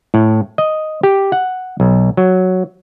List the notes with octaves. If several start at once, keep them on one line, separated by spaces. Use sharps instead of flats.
A2
D#5
G4
F#5
B1
F#3